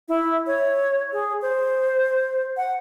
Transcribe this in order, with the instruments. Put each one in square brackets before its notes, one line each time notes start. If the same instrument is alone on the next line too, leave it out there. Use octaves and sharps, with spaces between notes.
[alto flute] E4
C#5
G#4
C5
F#5